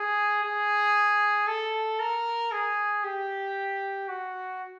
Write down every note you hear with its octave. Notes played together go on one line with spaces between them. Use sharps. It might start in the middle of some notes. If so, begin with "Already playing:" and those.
Already playing: G#4
G#4
A4
A#4
G#4
G4
F#4